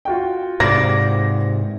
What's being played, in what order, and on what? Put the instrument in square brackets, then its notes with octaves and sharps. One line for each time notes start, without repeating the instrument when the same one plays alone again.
[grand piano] F4 F#4 G5
[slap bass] G#2 C3 [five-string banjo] D5 [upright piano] A#6